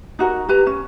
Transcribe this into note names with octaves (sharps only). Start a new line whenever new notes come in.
D#4 F#4 A#4
G4 B4 A#5
C#4